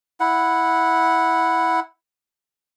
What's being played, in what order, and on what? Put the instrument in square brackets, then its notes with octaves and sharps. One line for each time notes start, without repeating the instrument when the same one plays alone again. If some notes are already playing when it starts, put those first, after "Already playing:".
[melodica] E4 F#5